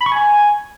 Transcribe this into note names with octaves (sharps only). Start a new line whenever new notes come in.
B5
C#6
G#5